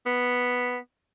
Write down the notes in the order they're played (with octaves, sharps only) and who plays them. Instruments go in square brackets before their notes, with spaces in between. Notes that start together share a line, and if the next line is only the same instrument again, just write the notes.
[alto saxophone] B3